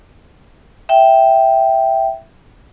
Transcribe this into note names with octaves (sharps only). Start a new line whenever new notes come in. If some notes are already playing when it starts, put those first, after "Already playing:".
E5 G5